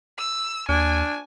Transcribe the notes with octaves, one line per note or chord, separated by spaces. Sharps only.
E6
D#2 D4 G#5